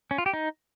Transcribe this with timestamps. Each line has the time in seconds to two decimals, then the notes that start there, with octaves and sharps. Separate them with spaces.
0.11 C#4
0.18 F4
0.26 G4
0.33 D#4